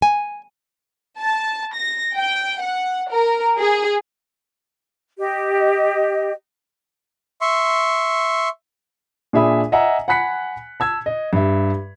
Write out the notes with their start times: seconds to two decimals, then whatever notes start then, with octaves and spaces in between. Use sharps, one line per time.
0.02 G#5
1.20 A5
1.74 A#6
2.15 G5
2.61 F#5
3.11 A#4
3.58 G#4
5.19 G4 D#5
7.41 E5 C6 C#6
9.33 A#2 D4 G#4 E5 B5 D#6
9.72 D#5 E5 F#5 G#5 A#5 E6
10.08 F#5 G#5 B5 F#6 B6 C#7
10.80 A5 E6 G#6
11.06 D#5
11.33 G2 E5